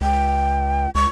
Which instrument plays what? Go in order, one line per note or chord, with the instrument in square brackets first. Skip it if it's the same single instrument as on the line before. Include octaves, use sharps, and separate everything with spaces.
[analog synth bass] C#2 [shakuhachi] G5
[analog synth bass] C#2 [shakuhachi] C#6